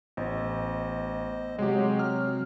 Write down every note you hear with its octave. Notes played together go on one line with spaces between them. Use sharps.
A1 B3 C5 D#5
C3 F#3 G#3 C4 G4
F6